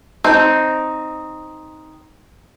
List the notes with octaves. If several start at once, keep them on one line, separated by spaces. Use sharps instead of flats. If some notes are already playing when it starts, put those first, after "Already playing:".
C4 D#4